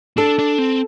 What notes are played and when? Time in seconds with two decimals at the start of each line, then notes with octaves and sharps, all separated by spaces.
0.17 D4 A4
0.39 D4
0.58 C4